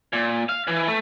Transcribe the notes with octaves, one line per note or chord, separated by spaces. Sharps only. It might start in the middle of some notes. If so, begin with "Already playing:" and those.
A#2
F5
E3
A3